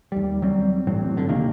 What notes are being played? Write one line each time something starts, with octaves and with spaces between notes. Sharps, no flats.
D#2 G3
F#3 G3 C4
A1 A2 F#3 C4
G#1 D3
D2 C3 D#3 A#3